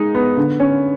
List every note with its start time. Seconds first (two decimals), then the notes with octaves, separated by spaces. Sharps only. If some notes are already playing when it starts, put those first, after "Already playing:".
Already playing: G#3 D#4
0.15 B3
0.37 D3
0.60 C#4